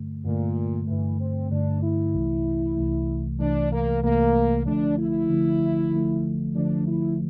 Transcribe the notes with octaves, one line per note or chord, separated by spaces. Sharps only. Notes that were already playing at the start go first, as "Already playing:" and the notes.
Already playing: G2 D3 A3
G2 A#2 D3 A3
G2 D3 E3 A3
C4
G2 D3 A3 D4
E4
C2 C3 E3 A3
C2 C3 E3 A3
C2 C3 E3 A3 D4
A#3
C2 C3 E3 A3 A#3
D3 F3 A3 D4
E4
D3 F3 A3
D3 F3 A3
D3 F3 A3 D4
E4